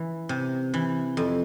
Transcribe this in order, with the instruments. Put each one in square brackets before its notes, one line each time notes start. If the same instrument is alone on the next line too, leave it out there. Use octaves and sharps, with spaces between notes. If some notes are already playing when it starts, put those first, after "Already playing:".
Already playing: [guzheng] E3
C3
E3
F2